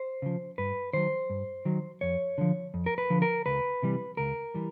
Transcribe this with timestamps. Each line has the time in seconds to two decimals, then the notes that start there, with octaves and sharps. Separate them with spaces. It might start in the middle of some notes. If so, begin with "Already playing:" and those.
Already playing: C5
0.22 C#3 F3
0.58 G2 B4
0.93 D#3 F#3 C5
1.30 G2
1.65 D#3 F#3
2.01 F2 C#5
2.38 D3 F3
2.74 F2
2.86 A#4
2.98 B4
3.10 D3 F3
3.22 A#4
3.46 C#2 B4
3.83 C3 E3 G3
4.17 C#2 A#4
4.54 E3 G3